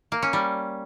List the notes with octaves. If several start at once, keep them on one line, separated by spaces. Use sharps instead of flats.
A#3
C#4
G3